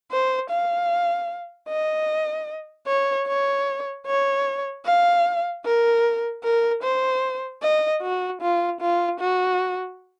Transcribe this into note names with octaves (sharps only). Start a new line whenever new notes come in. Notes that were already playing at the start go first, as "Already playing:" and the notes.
C5
F5
D#5
C#5
C#5
C#5
F5
A#4
A#4
C5
D#5
F#4
F4
F4
F#4